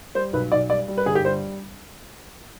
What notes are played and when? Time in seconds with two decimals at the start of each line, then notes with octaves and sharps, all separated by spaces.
0.15 G3 C5
0.33 B1 B4
0.52 B1 D5
0.70 G3 D5
0.88 G3
0.98 B4
1.06 G1 G#4
1.15 G4
1.24 G3 C5